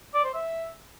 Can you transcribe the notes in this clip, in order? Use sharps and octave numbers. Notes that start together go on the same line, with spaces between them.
D5
C5
E5